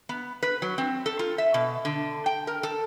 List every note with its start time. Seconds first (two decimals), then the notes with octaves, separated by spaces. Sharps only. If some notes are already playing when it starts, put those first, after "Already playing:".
0.09 B3
0.43 B4
0.62 F#3
0.78 C4
1.06 A4
1.19 F4
1.38 E5
1.54 B2
1.85 D3
2.26 G5
2.47 A#4
2.63 A4